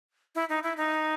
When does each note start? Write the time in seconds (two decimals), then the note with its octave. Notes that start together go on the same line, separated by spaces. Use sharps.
0.35 E4
0.49 D#4
0.63 E4
0.77 D#4